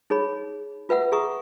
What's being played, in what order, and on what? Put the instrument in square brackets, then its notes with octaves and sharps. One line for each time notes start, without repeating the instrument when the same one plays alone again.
[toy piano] D#4 G#4 C#5 B5
F4 B4 E5 F#5 E6
G#4 E5 A#5 C#6 D#6